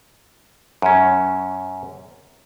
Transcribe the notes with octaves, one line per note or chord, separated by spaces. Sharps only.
F#2 C#4